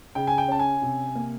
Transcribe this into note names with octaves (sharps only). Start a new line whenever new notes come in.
C#3 G5
G#5
G5
C#4 A5
G#5
C3
A#3